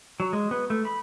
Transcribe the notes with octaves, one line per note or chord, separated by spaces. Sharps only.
F#3
G#3
B3
A3
B5